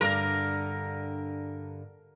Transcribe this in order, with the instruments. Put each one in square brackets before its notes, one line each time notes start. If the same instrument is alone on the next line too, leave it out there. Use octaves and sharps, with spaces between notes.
[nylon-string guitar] G2 D3 [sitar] A#4